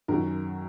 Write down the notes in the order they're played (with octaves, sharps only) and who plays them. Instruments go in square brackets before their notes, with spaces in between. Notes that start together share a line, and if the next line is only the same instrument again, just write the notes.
[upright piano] F#2 D#3 F#3 A#4